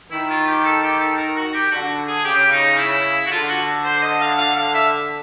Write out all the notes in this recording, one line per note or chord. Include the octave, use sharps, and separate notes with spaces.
D#3 E4
F4
G4
A4
G4
A4
A#4
F#4
G4
D3 F#4
G#4
C#3 G4
D#4
E4
F#4
D3 F4
F#4
C5
D#5
F5
F5
F5
E5